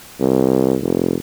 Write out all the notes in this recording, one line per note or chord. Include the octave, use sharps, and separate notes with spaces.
C2
F1